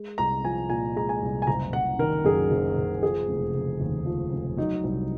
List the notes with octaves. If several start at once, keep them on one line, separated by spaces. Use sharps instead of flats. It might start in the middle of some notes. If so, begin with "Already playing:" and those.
Already playing: G#3
C2 A#5
F3 G#5
A#2 G#5
G#3 A#5
G#5
C2
G#5
F#1 A#5
F#1 F#5
D#3 A#4
F#2 G#4
F#1
F#1
F3 G#4
F1
C#3
D#2
F3
F1
F#3 D#4
C2